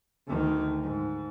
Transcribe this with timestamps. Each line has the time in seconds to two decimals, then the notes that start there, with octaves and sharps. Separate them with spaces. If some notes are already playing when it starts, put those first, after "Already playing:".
0.27 D2 D#3
0.82 G#2